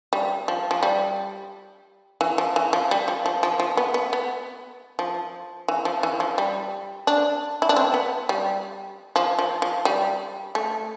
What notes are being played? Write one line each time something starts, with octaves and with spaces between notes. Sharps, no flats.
G3
F3
F3
G3
E3
F3
E3
F3
G3
F3
F3
F3
F3
B3
B3
B3
F3
E3
F3
E3
F3
G3
D4
E4
D4
C4
B3
G3
F3
F3
F3
G3
A3